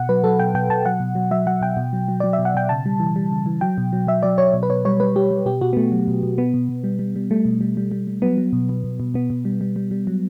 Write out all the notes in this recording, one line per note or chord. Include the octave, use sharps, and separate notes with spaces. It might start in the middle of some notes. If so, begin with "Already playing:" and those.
Already playing: B2 F#5
F#3 B4
F#3 A4
B2 G5
B2 G5
B2 A5
F#3 F#5
B2
F#3
F#3 E5
F#3 F#5
B2 G5
B2
F#3
F#3
F#3 D5
E5
B2
F#5
B2 G5
C#3 A5
G3
E3
G3
C#3
E3
F#3 G5
B2
F#3
F#3 E5
F#3 D5
F#3 C#5
B2
B4
B2 C#5
G3 C#5
G3 B4
G3 G4
G3
B2 G4
B2 F#4
B3
B2 A3
F#3
B2
B2
B2 B3
B2
B2
G3
G3
G3
G3 A3
B2
G3
G3
G3
G3
F#3 B3
F#3
B2
B2
B2
B2
B2 B3
B2
G3
G3
G3
G3
F#3